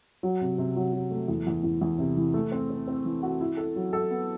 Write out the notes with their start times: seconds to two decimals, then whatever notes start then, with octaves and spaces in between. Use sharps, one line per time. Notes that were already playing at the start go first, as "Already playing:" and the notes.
0.23 F#3
0.41 C3
0.58 C3
0.76 F#3
0.93 F#3
1.11 A3
1.28 E2
1.47 E2
1.64 E2
1.81 E2
1.99 C3
2.17 E3
2.34 A3
2.52 C4
2.70 C4
2.88 C4
3.05 E3
3.22 F#4
3.41 E4
3.57 A4
3.76 F#3
3.93 A4
4.10 B3